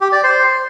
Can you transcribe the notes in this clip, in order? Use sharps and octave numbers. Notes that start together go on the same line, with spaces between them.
G4
D5
C5